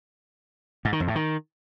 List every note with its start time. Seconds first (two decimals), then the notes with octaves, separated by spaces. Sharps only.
0.85 G#2
0.93 D#3
1.00 F2
1.08 A2
1.15 D#3